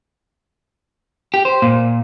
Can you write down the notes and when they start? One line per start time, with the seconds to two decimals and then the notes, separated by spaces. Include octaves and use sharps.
1.34 G4
1.45 C5
1.62 A#2